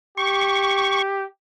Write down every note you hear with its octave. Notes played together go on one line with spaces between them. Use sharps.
G4 C#6